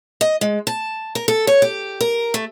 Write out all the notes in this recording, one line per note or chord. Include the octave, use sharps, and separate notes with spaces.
D#5
G#3
A5
A#4
A4
C#5
G4
A#4
A3